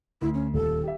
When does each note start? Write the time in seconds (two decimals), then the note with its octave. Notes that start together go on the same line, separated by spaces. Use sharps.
0.21 D2 E4
0.34 C#4
0.54 D#1 D#2 A4
0.83 G4 E5